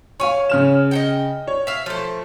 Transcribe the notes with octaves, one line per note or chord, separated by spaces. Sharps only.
C#5 F5 G#5 C#6
C#3 F6 E7
D#5 F#5 G5
C#5
E5 F5
F3 A3